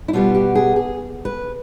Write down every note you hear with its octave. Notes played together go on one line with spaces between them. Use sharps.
E4
B2 G3 B3 F4
G4
G#4
G#4
B4